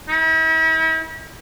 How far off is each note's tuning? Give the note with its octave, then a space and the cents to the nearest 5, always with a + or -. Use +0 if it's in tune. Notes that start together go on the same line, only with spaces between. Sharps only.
E4 -45